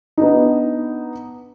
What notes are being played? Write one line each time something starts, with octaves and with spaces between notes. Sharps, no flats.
B3 D4 D#4